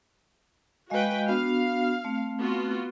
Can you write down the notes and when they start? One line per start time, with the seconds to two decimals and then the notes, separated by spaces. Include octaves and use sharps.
0.90 G#3 F#4 B4 D#5 F5 G5
1.28 B3 D4 F#4 F5
2.05 A3 C4
2.38 B3 F4 F#4